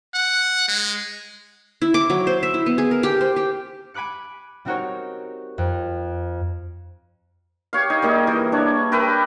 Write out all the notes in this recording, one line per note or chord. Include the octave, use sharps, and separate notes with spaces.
F#5
G#3
E4
D6
F#3
C5
E5
E4
B3
G#4
A#4
G4
C5
G4
G#5 B5 D6 F#6 C#7
G3 C4 D#4 F#4 A#4 C#5
F2
G4 C#5 F5
D#4
G3 A#3 D#4 G#4
E3
D4 C#5
G4 A#4 B4 E5